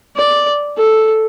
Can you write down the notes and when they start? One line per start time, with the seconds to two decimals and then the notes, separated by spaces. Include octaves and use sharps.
0.16 D5
0.77 A4